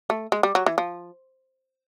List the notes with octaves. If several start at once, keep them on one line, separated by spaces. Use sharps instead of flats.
A3
G#3
G3
F#3
E3
F3